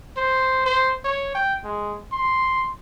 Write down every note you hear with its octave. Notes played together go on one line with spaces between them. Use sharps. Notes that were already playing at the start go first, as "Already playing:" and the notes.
C5
C5
C#5
G5
G#3
C6